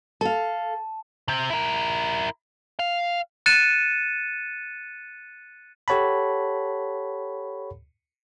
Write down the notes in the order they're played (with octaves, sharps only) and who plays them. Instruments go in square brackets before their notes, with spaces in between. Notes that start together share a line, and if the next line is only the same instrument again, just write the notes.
[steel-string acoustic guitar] A4 F5 [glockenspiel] A5
[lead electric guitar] C3 C4
E4 A#4
F5
[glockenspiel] F#6 A6 C#7 D#7 E7
[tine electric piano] G4 A4 C#5 F#5 A5 B5